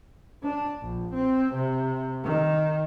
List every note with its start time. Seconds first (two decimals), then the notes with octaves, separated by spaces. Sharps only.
0.43 D4
0.82 A#1
1.14 C4
1.54 C3
2.24 D#3